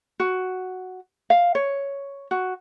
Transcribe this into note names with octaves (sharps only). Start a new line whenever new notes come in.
F#4
F5
C#5
F#4